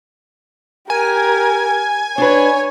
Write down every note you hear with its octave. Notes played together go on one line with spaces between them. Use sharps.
G4 A#4 G#5
D4 B4 C#5